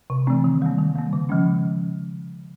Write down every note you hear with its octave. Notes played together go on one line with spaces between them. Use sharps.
C3
E3 A3 C4
D#3
G3 A#3
D#3
G3 A#3
C#3
F3 G#3 C#4